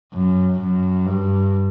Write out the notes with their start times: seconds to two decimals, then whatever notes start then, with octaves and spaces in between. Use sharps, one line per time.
0.14 F#2
0.60 F#2
1.06 G2